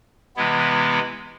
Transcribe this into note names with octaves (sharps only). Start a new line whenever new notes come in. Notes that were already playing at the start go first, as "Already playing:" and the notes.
C3 E3 G#3 B3 E4